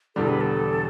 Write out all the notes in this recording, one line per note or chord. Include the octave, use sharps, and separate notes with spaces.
E1 E2 D3 G3 A4
B4
A4